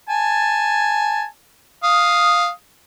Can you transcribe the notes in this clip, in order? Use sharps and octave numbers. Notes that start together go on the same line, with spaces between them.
G#5 A5
F5 D#6